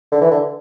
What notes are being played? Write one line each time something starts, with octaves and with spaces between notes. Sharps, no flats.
D3
E3
D3